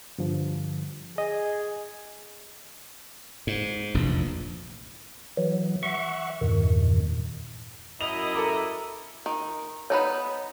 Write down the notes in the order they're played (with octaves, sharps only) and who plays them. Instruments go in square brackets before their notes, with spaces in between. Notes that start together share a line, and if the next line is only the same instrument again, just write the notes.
[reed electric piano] G2 D3 F3
[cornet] G#4 [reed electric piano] D#5
[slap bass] G#2
F1 A#1 E2
[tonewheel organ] E3 F#3
E5 F#5 C#6
E2 G2 A#2 D#3
[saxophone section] F#2 D#5 [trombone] E4 [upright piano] F7
[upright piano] A4 A#4 D6
[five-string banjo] D#3
[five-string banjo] B3 D#4 B4 [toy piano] C#5 B5